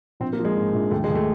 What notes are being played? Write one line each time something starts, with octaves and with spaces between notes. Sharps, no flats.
A#1 C4
A#3
F3
G#3
G#2
A#1
D#2 A3
G#3
D#2
A3